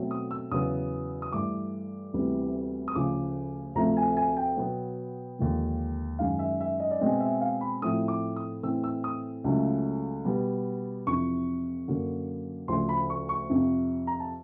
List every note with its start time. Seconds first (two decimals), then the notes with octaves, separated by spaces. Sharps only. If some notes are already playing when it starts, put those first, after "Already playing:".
Already playing: B2 F#3 A3 C4
0.11 D#6
0.31 E6
0.51 E2 C#3 F#3 B3 D#6
1.22 D#6
1.32 G2 E3 A3 D6
2.14 D2 C3 E3 G3 B3
2.88 D#6
2.95 D2 C#3 F3 D6
3.75 D2 C3 F3 A3 A#5
3.97 G#5
4.17 G#5
4.37 G5
4.57 B2 F#3 B3
5.39 D#2 D3 F3 G#3
6.19 F#2 D#3 G#3 F5
6.39 E5
6.61 E5
6.80 D#5
6.91 D5
7.00 B2 G#3 C4 D#5
7.20 E5
7.41 F5
7.61 B5
7.82 A2 F3 A3 C4 D#6
8.08 D6
8.36 D#6
8.62 A2 E3 A3 C4 E6
8.84 E6
9.04 D#6
9.44 C#2 C#3 F#3 A3
10.25 B2 G3 B3
11.07 F2 C3 E3 C#6
11.88 F#2 D3 F#3 A#3
12.68 D2 C#3 F3 C6
12.89 B5
13.10 C#6
13.29 C#6
13.50 F2 C3 F3
14.07 A#5
14.20 A5